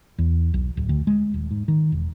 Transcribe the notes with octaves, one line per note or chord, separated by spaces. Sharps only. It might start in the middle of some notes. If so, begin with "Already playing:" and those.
E2
B1
D1
D2
G#3
D#1
G#2
D#3
E1